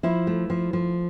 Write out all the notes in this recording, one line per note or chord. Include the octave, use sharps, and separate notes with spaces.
F3 E4
A3
F3
F3